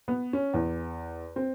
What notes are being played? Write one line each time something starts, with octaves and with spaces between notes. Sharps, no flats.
B3
C#4
E2
C4